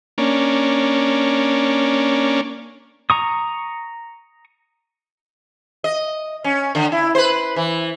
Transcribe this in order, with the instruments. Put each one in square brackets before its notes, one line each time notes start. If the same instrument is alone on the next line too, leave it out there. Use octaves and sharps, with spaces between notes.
[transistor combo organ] A#3 C#4 D4
[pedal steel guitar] A#5 C#6 D#6
[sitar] D#5
C#4
D3
E4
B4 C5
E3